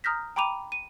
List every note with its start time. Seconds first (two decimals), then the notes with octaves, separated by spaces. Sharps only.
0.04 A#5 D#6 F6 G6 A#6 B6
0.36 G5 A#5 B5 D6 D#7 F7
0.72 D#7